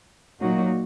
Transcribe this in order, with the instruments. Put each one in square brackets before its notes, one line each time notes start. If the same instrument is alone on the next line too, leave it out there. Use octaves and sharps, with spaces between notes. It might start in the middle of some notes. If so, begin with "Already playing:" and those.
[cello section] A#2 F#3 A#3 D#4 F#4